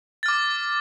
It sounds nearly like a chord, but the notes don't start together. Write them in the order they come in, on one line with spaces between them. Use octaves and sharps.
A6 F6 D6